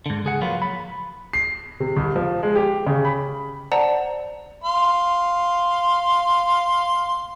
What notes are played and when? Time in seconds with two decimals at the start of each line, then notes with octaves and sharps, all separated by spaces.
0.06 G#2 D3
0.24 C#2 G#4 F#5
0.41 F3 F#3 A#3 F4 B4
0.62 B5
1.33 C7
1.80 C3
1.96 C2
2.16 F3
2.43 G#3
2.56 G4
2.87 C#3
3.05 B5
3.72 C5 D5 F#5 A5 A#5
4.64 F5 C6